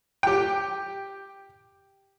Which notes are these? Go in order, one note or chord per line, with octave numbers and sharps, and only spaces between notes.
G4 G5